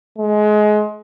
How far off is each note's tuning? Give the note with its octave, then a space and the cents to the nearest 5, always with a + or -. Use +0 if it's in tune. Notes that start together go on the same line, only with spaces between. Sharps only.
G#3 +25